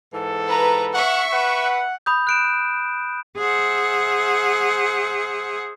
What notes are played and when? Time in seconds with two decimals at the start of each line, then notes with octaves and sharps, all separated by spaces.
0.14 G#2 E3 A4
0.47 B4 A#5
0.94 E5 F#5 C#6
1.32 B4 F#5
2.06 B5 D#6 G6
2.27 F#6 D7 E7
3.37 G#4 C5 E5 F#5